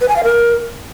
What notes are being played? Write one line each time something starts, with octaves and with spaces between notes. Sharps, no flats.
B4
G#5
F5
A#4